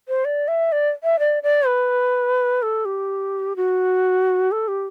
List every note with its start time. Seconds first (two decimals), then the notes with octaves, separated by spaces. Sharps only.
0.08 C5
0.25 D5
0.48 E5
0.72 D5
1.04 E5
1.19 D5
1.43 D5
1.66 B4
2.62 A4
2.85 G4
3.56 F#4
4.52 A4
4.68 G4